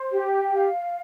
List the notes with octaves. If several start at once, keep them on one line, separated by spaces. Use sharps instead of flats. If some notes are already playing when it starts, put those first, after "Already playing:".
Already playing: C5
G4
F5